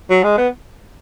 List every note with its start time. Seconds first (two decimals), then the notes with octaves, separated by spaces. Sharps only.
0.10 F#3
0.24 G#3
0.38 B3